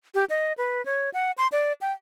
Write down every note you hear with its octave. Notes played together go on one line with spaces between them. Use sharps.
G4
D#5
B4
C#5
F#5
C6
D5
G5